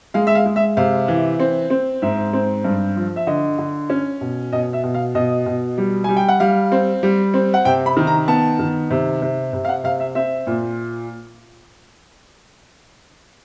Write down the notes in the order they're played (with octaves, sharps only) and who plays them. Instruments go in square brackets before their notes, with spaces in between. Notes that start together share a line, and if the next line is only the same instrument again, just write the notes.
[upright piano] G#3 F5
E5
F5
G#3
E5
C3 F5
E3
C4
C4
G#2 E5
C4
G2
F3
E5
D3 D#5
D3
C#4
B2
B2 D#5
E5
B2
F5
B2 D#5
B2
G3
G3 G#5
G5
F#5
G3 F5
C4
G3
C4
F#5
C3 G5
B5
D#3
A#5
B3 A5
D#3
C3
C3
C3
F5
F#5
C3 F5
E5
C4 E5
A#2